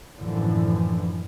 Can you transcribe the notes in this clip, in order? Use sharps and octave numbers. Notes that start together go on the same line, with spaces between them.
F#2 A2 D3 E3 F3